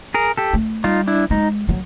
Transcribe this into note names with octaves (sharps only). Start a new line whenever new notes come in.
G#4 A#4
G4 A4
A3
G3 D#4 F4
D4 E4
G#3 D#4
F#3